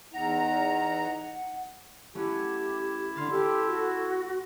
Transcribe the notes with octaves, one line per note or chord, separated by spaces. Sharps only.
E2 D#4 F#5 A#5
A3 C#4 E4 F#4 G4
D3 C6 F6 A6
G4 A4
F#4